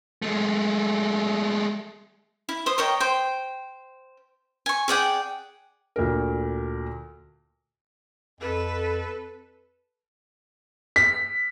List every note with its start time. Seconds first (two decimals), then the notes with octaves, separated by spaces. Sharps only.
0.22 G#3 A3
2.49 E4
2.66 C5 D#6
2.78 A#4 C#5 D#5 G5
3.00 C5 G5
4.66 G#5 C#6
4.88 G#4 D5 F#5 G5
5.96 D2 A#2 A#4
8.41 F2 A4 B4
10.96 B6